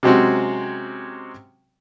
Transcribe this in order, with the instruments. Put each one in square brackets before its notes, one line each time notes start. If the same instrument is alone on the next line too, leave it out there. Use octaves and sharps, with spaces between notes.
[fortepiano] C3 F#3 G#3 C4 C#4 F#4